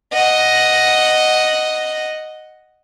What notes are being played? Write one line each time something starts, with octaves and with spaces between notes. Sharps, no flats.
D#5 F#5